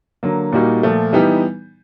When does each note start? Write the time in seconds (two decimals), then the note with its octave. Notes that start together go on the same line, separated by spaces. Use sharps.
0.23 D3 F#3 A#3
0.52 A#2 G3 A#3 D#4 F#4
0.83 A#2 F3 A3
1.13 E3 G3 B3 D#4 G4